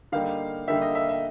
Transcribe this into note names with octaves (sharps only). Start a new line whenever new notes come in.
D3 G3 A#3 D#4 F5
D3 G3 A#3 D#4 E5
D#5
E5
E5